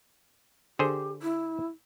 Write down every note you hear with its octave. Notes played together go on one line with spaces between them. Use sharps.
D3 G4 G#4 C5
E4